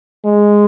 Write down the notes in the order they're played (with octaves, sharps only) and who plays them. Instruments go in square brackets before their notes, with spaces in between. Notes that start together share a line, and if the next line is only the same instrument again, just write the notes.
[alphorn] G#3